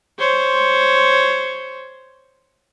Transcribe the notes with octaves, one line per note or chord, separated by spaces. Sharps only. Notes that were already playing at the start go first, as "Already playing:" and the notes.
C5 C#5